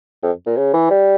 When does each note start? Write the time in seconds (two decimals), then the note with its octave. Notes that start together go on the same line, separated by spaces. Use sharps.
0.23 F2
0.46 A#2
0.57 C#3
0.74 E3
0.90 G3